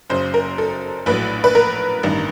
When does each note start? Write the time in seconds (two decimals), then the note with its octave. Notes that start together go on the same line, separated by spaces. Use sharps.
0.10 F#1 F#2 C#3 C5
0.34 A#4
0.58 A4
1.06 A#1 A2 F#3 B4
1.44 B4
1.55 A#4
2.03 A1 G2 D#3